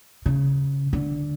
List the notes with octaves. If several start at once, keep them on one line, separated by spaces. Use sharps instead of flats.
C#3
D3